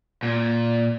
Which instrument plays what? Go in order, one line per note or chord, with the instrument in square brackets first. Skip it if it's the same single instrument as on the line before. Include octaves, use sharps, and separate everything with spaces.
[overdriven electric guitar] A#2